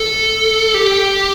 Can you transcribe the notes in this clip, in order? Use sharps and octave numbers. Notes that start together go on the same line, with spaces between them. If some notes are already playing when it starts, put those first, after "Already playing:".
Already playing: A4
G4